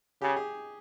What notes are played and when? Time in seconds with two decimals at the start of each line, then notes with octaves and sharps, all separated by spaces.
0.21 C#3 G4
0.36 G#4